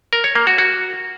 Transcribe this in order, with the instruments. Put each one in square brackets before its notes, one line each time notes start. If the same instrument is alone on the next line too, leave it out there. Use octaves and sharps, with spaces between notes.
[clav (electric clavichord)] A#4
C#5
A#3
F#4
F#4